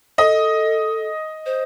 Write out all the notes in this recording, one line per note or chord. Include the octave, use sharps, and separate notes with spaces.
A4 D#5
C5